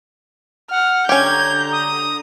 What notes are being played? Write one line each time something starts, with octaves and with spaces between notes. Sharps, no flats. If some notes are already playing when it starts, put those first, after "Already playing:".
F#5 F6
D3 C#4 G4 A#5 G6 G#6
D#6